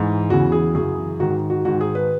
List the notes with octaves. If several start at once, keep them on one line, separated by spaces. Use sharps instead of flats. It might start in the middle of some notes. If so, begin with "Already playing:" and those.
Already playing: G#2 E3
E2 C#3 E3 F#4
G#4
F#2 C#3 E3 G#4
G#2 D#3 F#4
F#4
G#2 D#3 F#4
G#4
B4